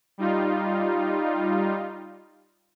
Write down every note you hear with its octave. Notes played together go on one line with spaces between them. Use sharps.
G3 D#4 F4